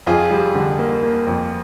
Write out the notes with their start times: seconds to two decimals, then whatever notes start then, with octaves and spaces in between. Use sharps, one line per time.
0.06 F2 F4 G#4
0.31 G3
0.55 D3
0.79 A#3
1.03 A#3
1.27 F2